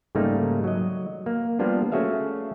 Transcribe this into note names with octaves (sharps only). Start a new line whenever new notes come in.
G#2 C#3 G3 A3 A#3 D#4
F#3 D#5
A#3
F3 G3 A#3 B3 D4 F4
A3 C#4 F#4 G#4 E5 F5